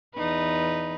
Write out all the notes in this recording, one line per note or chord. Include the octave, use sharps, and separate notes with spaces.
E2 D#4 B4